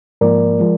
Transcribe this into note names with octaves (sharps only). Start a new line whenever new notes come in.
G#2 F3 A#3 A#4 D5
F3 G#3